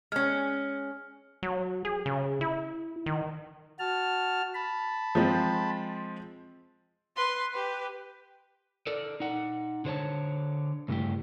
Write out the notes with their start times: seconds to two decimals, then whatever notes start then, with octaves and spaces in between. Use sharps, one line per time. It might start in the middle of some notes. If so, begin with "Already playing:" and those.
0.12 G#3 C#4 F6
1.43 F#3
1.85 G#4
2.06 C#3
2.41 E4
3.06 D#3
3.79 F#4 A5 F6
4.54 A5 B5
5.15 F3 G#3 C4
7.16 B4 C6
7.53 G4 B4
8.87 A4 A#4 D5
9.20 D#4 F#5
9.85 D3 C5 C#5 A5
10.88 G2 C#3 A3 E4 G4